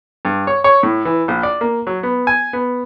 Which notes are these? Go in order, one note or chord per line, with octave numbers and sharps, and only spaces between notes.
G2
C#5
C#5
A2
E3
A#1
D5
A#3
F#3
B3
G#5
B3